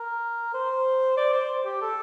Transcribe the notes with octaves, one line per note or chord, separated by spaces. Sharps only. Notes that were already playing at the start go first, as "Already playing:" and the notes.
Already playing: A#4
C5
D5
C5
G4
A4